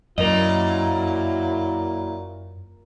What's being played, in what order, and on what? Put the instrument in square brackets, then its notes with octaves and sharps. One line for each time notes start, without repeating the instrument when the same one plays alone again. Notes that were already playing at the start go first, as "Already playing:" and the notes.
[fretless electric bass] F#2 [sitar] A#2 [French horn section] F#3 A#3 E4 [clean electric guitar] A#4 D#5